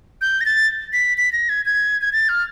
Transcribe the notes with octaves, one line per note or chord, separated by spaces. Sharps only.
G6
A#6
A6
B6
B6
A#6
G#6
G#6
G#6
A6
F6